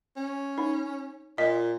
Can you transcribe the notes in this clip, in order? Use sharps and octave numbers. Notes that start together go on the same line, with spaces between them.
C#4
D#4
A#2 D#5